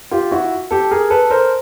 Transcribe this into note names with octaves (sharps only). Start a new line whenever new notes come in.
F4 G4
E4 F#4
G4 A4
G#4 A#4
A4 B4
A#4 C5